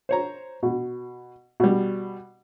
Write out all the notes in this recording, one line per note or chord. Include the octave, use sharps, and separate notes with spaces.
C5 C#5 A#5
B2
B2 G3